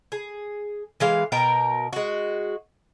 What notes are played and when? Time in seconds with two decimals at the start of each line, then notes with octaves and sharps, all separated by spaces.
0.12 G#4
1.00 E3 G#3 F5
1.32 B2 A#4 G5 A#5
1.93 G#3 F#4